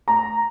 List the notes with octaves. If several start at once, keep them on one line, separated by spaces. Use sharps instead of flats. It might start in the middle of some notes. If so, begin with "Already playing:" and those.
A#5